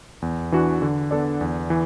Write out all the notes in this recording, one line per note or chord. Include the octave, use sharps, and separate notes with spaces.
E2
E3 D4 F#4
D3
B3 D4 A4 D5
E2
E3